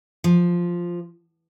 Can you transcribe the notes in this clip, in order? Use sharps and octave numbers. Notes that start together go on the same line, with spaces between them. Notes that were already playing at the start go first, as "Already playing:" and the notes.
F3